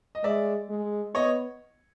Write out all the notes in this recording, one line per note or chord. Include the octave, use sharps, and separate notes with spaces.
D#5
G#3 D5 E5
G#3
B3 C#5 D#5